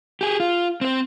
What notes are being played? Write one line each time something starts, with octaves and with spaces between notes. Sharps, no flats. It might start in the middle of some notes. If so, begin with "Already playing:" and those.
G4 G#4
F4
C4 C5